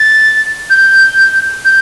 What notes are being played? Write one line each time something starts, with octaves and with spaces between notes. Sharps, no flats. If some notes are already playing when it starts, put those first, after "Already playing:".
Already playing: A6
G6
G6